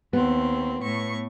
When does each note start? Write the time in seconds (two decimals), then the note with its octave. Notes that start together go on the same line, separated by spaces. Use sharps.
0.13 D#2 B3 C4
0.82 A2 C#6